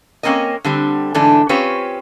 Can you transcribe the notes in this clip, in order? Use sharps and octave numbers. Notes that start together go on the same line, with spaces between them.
A#3 C4 C#4 A#4 D#5
D3 G3 C4
G#2 D3 E3 A3 D4
C4 C#4 F4 G4 B4 C#5